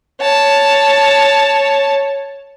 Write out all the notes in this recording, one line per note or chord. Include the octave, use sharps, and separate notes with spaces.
C#5 A5